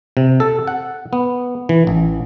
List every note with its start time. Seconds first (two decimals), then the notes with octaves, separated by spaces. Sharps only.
0.17 C3
0.40 A4
0.67 F#5
1.13 B3
1.69 E3
1.87 A1